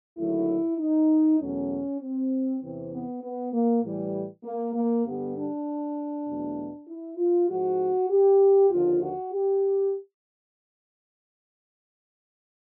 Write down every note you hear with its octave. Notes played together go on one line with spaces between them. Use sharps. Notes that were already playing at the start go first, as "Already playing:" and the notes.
D#2 D3 F#3 A3 E4
D#4
E2 B2 F#3 A3 C#4
C4
E2 C3 E3 C4
B3
B3
A#3
A2 E3 G3
A#3
A#3
G2 D3 G3 B3
D4
E2 B2 F#3 A3
E4
F4
G#2 F3 G#3 F#4
G4
D#2 D3 F3 F4
F#4
G4